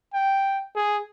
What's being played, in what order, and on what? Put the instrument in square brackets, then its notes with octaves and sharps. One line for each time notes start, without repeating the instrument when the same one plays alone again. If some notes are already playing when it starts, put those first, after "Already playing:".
[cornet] G5
G#4